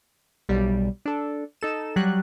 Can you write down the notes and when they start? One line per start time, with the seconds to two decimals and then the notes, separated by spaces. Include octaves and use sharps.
0.49 B1 G3
1.06 D4 A4
1.61 D#4 A4 E7
1.96 F#3 G3 F#6